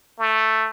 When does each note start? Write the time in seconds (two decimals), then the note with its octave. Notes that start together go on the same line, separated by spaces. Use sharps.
0.19 A3